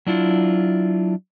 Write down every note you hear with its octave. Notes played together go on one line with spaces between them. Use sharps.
F#3 D4 E4 F4